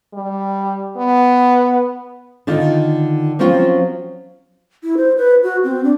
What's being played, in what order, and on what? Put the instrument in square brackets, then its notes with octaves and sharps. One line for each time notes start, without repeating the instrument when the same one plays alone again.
[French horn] G3
B3
[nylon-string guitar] D3 D#3 D#4 F4
F3 F#3 C4 C#4 F4
[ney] E4
C5
B4
F#4
C4
D4